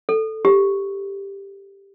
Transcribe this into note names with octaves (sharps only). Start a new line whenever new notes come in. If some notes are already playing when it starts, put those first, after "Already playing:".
A4
G4